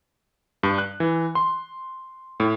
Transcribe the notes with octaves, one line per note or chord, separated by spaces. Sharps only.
G2
F#6
E3
C6
A2